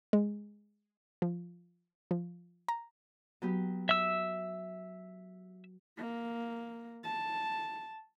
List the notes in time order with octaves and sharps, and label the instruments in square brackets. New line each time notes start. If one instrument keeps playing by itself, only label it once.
[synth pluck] G#3
F3
F3
A#5
[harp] F#3 B3 G4
[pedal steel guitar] E5 E6
[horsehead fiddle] A#3
A5